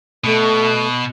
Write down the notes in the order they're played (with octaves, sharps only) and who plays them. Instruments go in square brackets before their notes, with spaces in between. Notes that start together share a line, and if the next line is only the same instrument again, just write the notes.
[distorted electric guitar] B2 [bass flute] A3